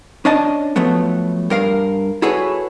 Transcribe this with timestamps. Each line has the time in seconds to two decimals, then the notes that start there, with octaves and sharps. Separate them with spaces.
0.25 C#4 D4 D#5 A5
0.76 F3 F#3 A3 B3
1.50 G2 A#4 F5
2.22 E4 F#4 G#4 A4 B4 C#5